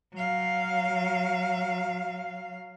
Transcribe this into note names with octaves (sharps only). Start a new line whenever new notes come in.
F#3 F5